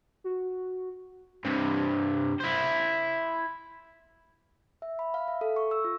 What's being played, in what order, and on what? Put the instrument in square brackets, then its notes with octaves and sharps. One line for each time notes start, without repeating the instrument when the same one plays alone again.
[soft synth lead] F#4
[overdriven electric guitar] G2 C3
E4 C5
[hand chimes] E5
B5
F5
E5
A4
C#6
E6
F4